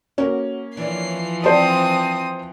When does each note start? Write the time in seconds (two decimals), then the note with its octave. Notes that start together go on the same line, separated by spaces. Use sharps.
0.18 A#3 C#4 F#4 A#4
0.77 E3 F3 D4 E4 C7
1.44 C4 C5 D5 A5 D#6